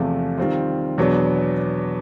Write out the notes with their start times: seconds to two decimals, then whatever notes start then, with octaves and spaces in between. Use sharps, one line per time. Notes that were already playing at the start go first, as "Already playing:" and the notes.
Already playing: E2 C3 F3 A3
0.38 D#3 G3 C4 F4
0.98 E2 B2 F#3 B3 D4